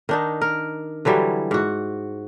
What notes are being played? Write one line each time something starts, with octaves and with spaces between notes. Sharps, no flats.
D#3 D4 D#4
A#4
D3 E3 F#3 G3
G#2 F#4